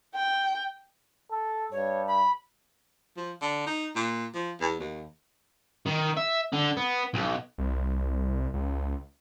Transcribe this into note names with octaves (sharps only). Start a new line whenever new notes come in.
G5
A4
G2 C#5
B5
F3
D3
D#4
A#2
F3
E2
D#2
D#3
E5
D3
B3
B1
C2
C#2